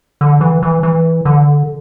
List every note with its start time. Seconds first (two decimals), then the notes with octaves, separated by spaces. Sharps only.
0.21 D3
0.41 E3
0.62 E3
0.83 E3
1.25 D3